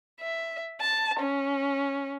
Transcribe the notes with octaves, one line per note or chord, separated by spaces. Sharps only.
E5
A5
C#4